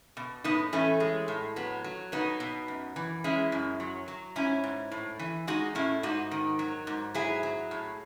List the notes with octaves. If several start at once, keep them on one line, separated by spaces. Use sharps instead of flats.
B2
A2 B3 D#4
E3 A3 C#4
G#3
A2
F#3 B3
F#3
B2 B3 D#4
B2
F#2
E3
G#3 C#4 E4
F#2
F#3
F#3
G#2 C#4 E4
G#2
A2
E3
G#3 D#4 F#4
A2 C#4 E4
G#2 D#4 F#4
D#3
F#3
G#2
F#3 E4 G#4
F#3
A2